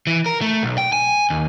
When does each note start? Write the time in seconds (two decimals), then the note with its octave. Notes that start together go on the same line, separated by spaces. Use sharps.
0.07 E3
0.26 A#4
0.41 A3
0.63 B1
0.78 G5
0.93 G#5
1.30 D#2